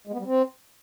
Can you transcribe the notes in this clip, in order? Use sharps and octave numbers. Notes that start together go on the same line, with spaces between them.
G#3
B3
G3
C4